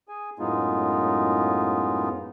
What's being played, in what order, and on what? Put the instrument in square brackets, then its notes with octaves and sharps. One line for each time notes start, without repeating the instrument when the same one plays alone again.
[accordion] G#4 G#5
F#2 A2 G#3 B3 D#4 F4